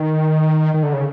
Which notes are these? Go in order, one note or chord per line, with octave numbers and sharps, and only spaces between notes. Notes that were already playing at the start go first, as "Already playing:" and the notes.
Already playing: D#3
D#3
D3
C#3